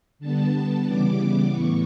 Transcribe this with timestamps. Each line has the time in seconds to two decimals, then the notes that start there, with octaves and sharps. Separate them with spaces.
0.19 D3 G3 B3 A5
0.85 C#3 E3 G3 B3 D6
1.50 A2 E3 B3 C#6